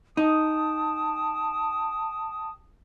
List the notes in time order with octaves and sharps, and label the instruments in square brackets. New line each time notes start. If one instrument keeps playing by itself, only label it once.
[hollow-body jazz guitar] D#4 [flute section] G5 A5 D#6